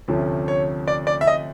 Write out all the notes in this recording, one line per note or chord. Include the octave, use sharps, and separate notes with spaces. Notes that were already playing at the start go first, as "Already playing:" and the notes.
D2 C3 F3 A3 C#4
C#5
D5
D5
E5
D#5